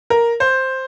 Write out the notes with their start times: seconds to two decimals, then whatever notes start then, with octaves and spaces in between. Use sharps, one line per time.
0.10 A#4
0.40 C5